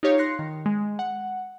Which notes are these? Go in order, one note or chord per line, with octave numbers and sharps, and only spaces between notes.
D#4 F4 G4 C#5 F5
C6 F#6 A#6 C7 C#7
D#3
G#3
F#5